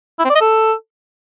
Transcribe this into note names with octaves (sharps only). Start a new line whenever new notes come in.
E4
C4
D5
D#5
A4